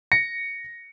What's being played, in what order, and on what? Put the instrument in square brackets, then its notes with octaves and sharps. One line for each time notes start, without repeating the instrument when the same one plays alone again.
[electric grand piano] A#6 C#7